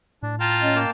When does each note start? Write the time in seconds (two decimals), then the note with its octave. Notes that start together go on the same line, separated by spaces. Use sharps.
0.23 A2 D4
0.40 F4 G5 A5 A#5
0.60 C#4 D#5
0.76 A#3 G5 A5